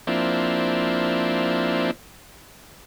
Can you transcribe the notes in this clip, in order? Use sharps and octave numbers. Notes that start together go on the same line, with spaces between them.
F3 A#3 C4 D4 E4